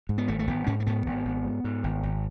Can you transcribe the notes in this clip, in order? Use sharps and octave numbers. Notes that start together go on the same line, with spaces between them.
G#2
B3
G#1 A3
A3
G#1 B3
G#2 C#4
A3
G#2 B3
G#1
G#1
G#2
G#2
G#1
G#1